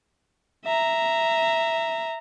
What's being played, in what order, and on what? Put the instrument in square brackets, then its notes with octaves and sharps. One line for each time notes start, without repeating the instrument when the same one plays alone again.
[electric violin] E5 A#5